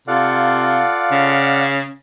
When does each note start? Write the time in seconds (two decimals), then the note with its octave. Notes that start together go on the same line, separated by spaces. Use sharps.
0.08 C3 F4 A4 D5 F5 F#5
1.12 C#3